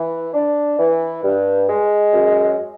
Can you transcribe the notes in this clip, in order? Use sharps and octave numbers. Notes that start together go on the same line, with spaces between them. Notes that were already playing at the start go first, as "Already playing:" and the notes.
Already playing: E3
D4
E3
G2
G#3
F#2